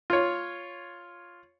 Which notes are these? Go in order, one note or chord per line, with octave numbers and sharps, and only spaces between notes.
F4 C#5